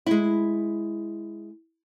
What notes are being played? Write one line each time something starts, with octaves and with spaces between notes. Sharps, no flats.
G#3 E4